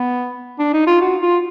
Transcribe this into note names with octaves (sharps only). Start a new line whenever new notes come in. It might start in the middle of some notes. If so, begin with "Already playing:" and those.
Already playing: B3
D4
D#4
F4
F#4
F4